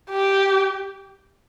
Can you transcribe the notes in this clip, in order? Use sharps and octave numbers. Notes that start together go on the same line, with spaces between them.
G4